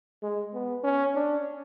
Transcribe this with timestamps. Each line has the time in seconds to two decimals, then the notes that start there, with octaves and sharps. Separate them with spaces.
0.23 G#3
0.54 B3
0.84 C#4
1.15 D4